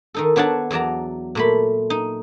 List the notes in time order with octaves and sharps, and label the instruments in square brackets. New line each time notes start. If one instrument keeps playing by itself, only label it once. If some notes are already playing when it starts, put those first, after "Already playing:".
[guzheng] D#3 D#4 A4
B3 D4 C#5 F#5 A5
E2 F#3 D5 A5 A#5
A#2 A3 B5
D#4